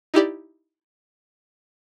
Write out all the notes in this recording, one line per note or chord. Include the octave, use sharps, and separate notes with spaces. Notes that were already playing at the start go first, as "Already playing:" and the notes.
D#4 E4 G4 D5